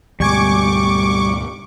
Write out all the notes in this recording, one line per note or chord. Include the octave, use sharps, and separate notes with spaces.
D2 G#2 B2 G3 G#5 C#6 D6